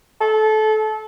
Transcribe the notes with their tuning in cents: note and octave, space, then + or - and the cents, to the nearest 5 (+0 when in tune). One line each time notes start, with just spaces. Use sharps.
A4 -25